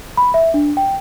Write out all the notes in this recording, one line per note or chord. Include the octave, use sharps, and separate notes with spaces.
B5
E5
D4
G5